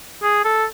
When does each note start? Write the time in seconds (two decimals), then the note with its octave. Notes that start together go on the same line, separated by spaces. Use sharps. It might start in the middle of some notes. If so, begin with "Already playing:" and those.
0.23 G#4
0.45 A4